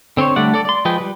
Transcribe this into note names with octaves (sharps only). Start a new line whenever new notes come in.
D3 C4 C5 C#5
D3 G3 A3 D5 F#5
A4 D5
D5 C6
F3 G#3 G#4 B4 G5
G3 B4